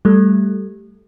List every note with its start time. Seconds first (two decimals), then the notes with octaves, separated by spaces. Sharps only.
0.05 G3 A3